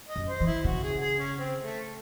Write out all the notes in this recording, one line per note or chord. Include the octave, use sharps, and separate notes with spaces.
D#5
F#2
C5
E3
E4
C#3 F#4
G#4
G#4
C#4
C4
A3